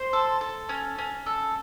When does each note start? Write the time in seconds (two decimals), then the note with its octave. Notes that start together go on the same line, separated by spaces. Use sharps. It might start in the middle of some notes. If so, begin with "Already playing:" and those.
Already playing: C5 C6
0.13 A4
0.41 A4
0.69 C#4
0.98 C#4
1.26 A4